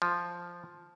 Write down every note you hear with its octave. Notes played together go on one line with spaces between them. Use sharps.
F3